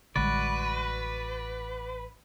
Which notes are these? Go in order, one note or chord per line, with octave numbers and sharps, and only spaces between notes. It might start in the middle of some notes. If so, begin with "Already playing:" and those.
A1 D3 G3 G#3 F#4 B4 D5